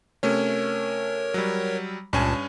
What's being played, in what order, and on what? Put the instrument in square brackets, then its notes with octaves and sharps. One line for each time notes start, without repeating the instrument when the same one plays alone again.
[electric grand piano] C3 A3 C#4 [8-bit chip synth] A#4 C#5
[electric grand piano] F#3 G3
[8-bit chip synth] C#2 A#2 A5 [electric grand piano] G2 C#4 G#5